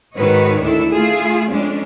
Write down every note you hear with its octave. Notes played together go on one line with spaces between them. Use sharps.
G#2 D#3 F#4 B4 C#5 D#5
D2 D4 E4 A4
A3 F4 G#4
F2 G#3 C#4 D4